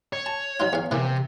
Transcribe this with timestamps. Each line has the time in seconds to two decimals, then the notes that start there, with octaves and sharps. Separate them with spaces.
0.13 C#5
0.26 A5
0.60 F#3 D#4 F4
0.73 E2 F5
0.91 C3 E3 A#3